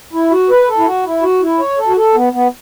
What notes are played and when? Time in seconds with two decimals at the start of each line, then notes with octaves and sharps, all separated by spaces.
0.13 E4
0.30 F#4
0.50 B4
0.68 A4
0.78 E4
0.85 F#4
1.05 E4
1.22 F#4
1.41 E4
1.60 C#5
1.78 A4
1.87 F#4
1.96 A4
2.14 B3
2.33 B3